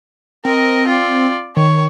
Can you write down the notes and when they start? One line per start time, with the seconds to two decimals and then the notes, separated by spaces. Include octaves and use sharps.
0.45 C4 A#4 D#5
0.87 F4 D5
1.56 D#3 C#5